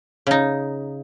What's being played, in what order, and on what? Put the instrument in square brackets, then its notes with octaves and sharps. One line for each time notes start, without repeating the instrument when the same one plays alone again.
[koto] C#3 D#4